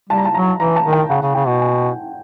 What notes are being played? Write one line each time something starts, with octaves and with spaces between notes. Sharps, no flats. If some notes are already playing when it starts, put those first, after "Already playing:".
G3 A5
A#5
A5
F#3 A#5
E3 A#5
A5
D#3
G5
C#3 F#5
C#3
C#3 G5
B2
G#5
G#5